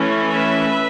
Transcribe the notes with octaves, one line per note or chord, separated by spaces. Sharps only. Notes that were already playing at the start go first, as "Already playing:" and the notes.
Already playing: E3 A3 C#4
B4 E5